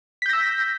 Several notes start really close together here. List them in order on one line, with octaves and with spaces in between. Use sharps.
B6 G6 A#6 E6